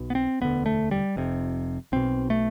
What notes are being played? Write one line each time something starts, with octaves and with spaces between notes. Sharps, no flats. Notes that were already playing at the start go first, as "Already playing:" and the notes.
Already playing: B1 B2
B3
C4
E1 D2 D3 B3
A3
G3
F1 F2 C3
B1 B2 C4
A3